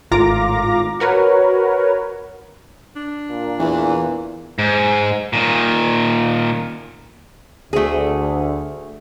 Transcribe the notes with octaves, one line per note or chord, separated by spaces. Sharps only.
G#1 A2 F4 A#5 D6 A#6
F#4 A#4 B4 C#5
D4
A#2
E2 E3
G#2
A#2 D#3
D2 A3 G#4